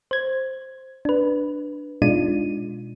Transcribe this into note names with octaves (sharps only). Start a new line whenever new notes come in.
C5 G#6
D4 B4
B2 G#3 D4 D#4 F4 D#7